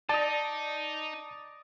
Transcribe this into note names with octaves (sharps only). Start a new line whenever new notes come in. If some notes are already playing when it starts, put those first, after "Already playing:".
D#4 D5 D#5 A5